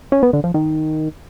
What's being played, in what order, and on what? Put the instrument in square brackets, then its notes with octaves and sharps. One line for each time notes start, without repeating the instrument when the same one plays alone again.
[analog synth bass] C#4
B3
D3
F3
D#3